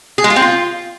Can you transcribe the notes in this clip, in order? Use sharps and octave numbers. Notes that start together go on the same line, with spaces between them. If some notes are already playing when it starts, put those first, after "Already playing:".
G#4
G#3
F4
C4
F4